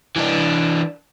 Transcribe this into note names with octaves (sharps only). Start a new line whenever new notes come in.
E3 D4